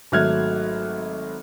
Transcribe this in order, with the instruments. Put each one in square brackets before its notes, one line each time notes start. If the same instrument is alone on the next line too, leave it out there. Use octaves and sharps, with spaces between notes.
[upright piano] G#1 F#3 A3 F6 F#6 G#6